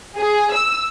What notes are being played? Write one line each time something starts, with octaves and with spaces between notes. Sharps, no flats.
G#4
E6